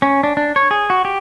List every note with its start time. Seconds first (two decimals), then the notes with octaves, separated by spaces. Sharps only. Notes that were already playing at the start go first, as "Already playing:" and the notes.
0.02 C#4
0.23 D4
0.37 D4
0.56 C#5
0.71 G#4
0.90 F#4
1.05 G4